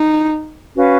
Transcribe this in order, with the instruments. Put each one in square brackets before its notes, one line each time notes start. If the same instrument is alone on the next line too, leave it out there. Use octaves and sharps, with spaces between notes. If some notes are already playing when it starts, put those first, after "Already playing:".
Already playing: [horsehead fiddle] D#4
[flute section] C#4 F#4 B4 F5